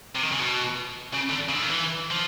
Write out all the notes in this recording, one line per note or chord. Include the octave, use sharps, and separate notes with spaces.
C3
D#3
C#3
B2
C#3
D3
C#3
D3
D#3
E3
F3